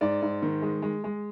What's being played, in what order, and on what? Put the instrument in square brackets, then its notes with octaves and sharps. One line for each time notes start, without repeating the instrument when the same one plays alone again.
[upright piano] G#2 D5
G#2
D#3
G#3
G#3
G#3